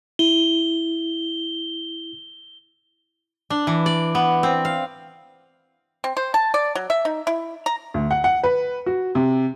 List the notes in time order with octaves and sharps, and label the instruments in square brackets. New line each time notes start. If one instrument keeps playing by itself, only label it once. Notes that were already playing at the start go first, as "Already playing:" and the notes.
[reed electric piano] E4 [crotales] G7
[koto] D4
E3
D5
B3
C4
F5
[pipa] C4
C5
A5
D5
F#3
E5
D#4
E4
A#5
[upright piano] D2
F#5
F#5
B4
F#4
C3